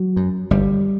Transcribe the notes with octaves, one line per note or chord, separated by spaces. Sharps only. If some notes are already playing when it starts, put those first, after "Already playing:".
Already playing: F#3
F#2
G1 G3